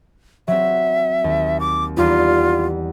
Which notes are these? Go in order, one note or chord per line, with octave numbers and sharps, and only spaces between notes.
F#3 C4 E5
D#2
D6
E2 G3 D#4 F4